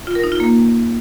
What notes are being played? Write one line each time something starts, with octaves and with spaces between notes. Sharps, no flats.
F4
A#4
D#4
F4
A#3